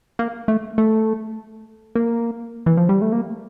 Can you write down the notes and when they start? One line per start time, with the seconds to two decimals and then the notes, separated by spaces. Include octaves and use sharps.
0.19 A#3
0.48 A3
0.78 A3
1.95 A#3
2.66 E3
2.77 F3
2.89 G3
3.02 A3
3.12 A#3